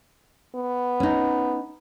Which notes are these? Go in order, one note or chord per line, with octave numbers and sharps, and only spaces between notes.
B3
C#4 D#4